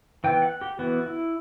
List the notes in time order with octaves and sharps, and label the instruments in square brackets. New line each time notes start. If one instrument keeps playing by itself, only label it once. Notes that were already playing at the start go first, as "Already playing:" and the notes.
[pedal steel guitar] E3 B3 G5
F#5
G4
E3 B3 F#4
E4